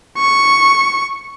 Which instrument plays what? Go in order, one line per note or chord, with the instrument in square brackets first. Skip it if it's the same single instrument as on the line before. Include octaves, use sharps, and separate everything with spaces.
[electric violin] C#6